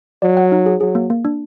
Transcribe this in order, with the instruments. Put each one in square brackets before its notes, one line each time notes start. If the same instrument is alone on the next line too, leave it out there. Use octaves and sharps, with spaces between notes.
[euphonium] F#3 [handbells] D5
[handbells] F#5
D#4
G#4
[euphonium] F#3 [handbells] G#4
[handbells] A#3
A#3
D4